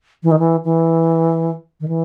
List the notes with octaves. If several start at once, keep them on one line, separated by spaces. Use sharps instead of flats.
E3
D#3
E3
E3
D#3
E3